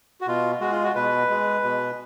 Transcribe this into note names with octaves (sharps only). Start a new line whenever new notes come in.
F#4
B2 F4
G#3 F#4
F4
F#4
B2 B4
G#3
B2